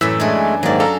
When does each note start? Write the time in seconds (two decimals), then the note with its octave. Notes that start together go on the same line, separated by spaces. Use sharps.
0.01 F#2 A2 E3 E6 B6
0.20 G#3 A3 D4 G#4
0.63 G#2 D#3 F#3 A#3 D5
0.80 C#4 A4 F5 A#5